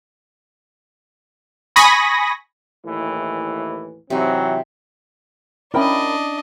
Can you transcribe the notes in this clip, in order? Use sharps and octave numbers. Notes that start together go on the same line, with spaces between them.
G#5 B5 C#6 D#6 A#6
D#2 A2 E3
C3 E3 F#3 C4 D#4
C#4 D4 E4 A#4 D#5 G5 B5